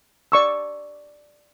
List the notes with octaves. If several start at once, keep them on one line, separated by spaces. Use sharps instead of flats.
D5 C#6 E6